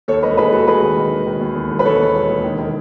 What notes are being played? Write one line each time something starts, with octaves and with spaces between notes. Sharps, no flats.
D#2 A4 C#5
E1 B4 D#5
A4
D#2 G#4 B4
E1 F#4 A4
E1 G#4 B4
D#3
D#3
E1
D#3
D#2
D#2
E1
B4
E1 A4 C#5
D#2
E1
E1
D#3
D#3